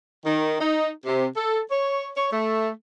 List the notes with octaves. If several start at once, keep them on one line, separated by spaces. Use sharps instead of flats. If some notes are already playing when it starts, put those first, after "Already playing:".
D#3
D#4
C3
A4
C#5
C#5
A3